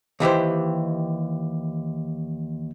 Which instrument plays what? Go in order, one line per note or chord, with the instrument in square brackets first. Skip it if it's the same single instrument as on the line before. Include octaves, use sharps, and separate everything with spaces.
[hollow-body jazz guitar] D#2 E3 G4 C5